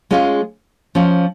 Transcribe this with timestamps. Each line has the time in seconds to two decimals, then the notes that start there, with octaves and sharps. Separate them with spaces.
0.11 G#3 C#4 F4 G#4
0.95 F3 C#4 F4